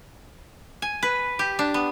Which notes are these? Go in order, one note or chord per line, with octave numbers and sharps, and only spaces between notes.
G#5
B4
G4
D4
B3